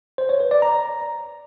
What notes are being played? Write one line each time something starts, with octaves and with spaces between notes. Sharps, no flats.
C5
C#5
B4
D5
A#5